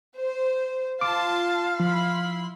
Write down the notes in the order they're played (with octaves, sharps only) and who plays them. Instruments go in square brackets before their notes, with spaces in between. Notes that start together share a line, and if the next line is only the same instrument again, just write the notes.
[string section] C5
[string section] F4 A5 C6 [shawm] F5 [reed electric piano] D6
[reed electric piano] F3 [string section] E4 B5 C6